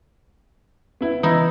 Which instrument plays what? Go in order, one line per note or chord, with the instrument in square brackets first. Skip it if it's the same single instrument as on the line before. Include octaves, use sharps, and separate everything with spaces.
[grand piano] B3 E4
[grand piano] E3 [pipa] D#4 E4